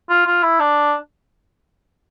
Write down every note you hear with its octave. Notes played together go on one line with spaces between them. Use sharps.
F4
F4
E4
D4